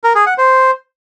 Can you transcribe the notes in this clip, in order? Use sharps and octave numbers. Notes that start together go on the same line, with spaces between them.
A#4
G#4
F#5
C5